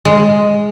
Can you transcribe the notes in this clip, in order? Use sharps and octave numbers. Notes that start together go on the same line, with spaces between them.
G#3